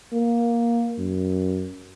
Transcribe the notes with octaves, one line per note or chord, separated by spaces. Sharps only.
A#3
F#2